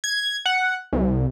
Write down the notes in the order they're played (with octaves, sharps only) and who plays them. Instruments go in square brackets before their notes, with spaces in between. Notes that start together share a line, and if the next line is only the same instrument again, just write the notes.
[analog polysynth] G#6
F#5
C2